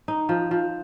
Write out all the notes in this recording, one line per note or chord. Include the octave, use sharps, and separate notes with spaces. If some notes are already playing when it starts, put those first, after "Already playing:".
D#4
F3
F3